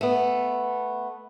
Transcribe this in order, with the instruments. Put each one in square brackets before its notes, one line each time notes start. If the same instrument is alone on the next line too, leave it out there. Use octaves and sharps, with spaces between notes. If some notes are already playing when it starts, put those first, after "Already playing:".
[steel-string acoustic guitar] A3 B3